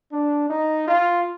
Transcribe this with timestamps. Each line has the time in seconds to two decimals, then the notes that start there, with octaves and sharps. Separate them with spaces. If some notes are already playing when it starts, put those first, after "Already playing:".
0.12 D4
0.50 D#4
0.88 F4